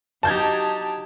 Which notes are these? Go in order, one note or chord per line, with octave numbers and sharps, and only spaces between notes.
F#3 D#4 G4 A5 G6 G#6